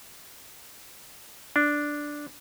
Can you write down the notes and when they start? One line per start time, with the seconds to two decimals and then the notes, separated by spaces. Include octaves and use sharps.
1.56 D4